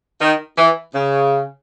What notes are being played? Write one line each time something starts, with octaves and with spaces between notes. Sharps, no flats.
D#3
E3
C#3